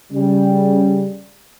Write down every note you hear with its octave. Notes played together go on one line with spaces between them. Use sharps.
C#3 G3